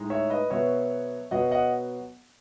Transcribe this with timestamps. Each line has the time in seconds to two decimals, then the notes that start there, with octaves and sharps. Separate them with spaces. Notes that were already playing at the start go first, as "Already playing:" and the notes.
Already playing: A2 G#3 D#4
0.10 C#5 E5
0.30 B4 D#5
0.50 B2 F#3 B3 C#5 E5
1.31 B2 F#3 B3 D#5 F#5
1.51 D#5 F#5